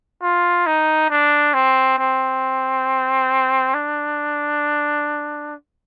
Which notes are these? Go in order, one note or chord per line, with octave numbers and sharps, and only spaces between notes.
F4
D#4
D4
C4
C4
D4